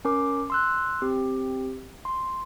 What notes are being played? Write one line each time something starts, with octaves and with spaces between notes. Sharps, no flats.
C#4 A#4 D6
C6 E6 F#6
C4 G4
C6